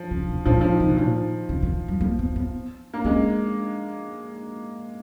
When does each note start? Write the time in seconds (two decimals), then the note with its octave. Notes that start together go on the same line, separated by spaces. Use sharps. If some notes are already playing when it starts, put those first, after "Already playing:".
Already playing: F3
0.11 C#3
0.28 B2
0.45 A#2 F3
0.61 F3
0.72 D#3
0.80 C#3
0.89 B2
0.97 A#2 F3
1.49 C#3
1.63 D#3
1.88 F#3
2.01 A#3
2.19 B3
2.36 B3
2.94 A#3
3.04 G#3 C#4